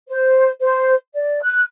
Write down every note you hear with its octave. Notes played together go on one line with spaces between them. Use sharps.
C5
C5
D5
F#6